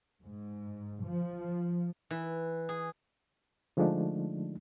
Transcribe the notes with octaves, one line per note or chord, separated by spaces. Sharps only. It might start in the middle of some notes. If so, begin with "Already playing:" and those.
G#2
F3
E3
G#4
D3 F3 G#3 A3 D4 D#4